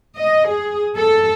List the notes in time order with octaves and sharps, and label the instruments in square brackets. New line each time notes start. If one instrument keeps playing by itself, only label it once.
[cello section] D#5
G#4
A4